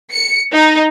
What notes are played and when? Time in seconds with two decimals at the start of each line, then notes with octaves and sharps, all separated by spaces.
0.12 C#7
0.53 D#4